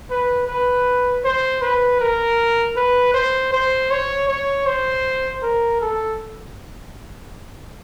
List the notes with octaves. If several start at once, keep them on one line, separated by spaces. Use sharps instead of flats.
B4
B4
C5
B4
A#4
B4
C5
C5
C#5
C#5
C5
A#4
A4